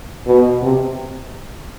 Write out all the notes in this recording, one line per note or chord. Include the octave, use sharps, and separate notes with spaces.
B2
C3